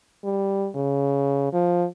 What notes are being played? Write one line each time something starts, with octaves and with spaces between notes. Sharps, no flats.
G3
C#3
F3